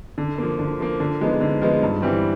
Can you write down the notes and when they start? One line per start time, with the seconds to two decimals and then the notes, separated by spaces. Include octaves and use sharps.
0.18 D3
0.38 F3 A#3
0.59 D3
0.80 F3 A#3
1.00 D3
1.21 F3 G#3 B3 D#4
1.41 D3
1.62 F3 G#3 B3 D#4
1.83 G2
2.02 E3 G3 C4